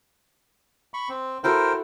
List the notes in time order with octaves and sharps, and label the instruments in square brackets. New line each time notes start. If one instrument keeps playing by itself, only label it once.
[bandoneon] B5 C#6
C4
[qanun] E4 F#4 A4 [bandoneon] A#4 C5 G5